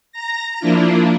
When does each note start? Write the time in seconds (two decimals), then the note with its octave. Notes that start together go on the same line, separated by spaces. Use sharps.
0.12 A#5 A#6
0.60 F3 A#3 D4 E4 F4